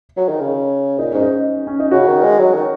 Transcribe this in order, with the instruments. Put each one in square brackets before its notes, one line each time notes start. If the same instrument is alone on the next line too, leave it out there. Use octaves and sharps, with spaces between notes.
[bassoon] F#3
D#3
C#3
[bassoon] A#2 [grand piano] D#4
[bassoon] G#2 [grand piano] C#4
[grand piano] D#4
C#4
D#4
[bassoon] C#3 [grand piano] F#4
[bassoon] D#3
G#3
F#3
D#3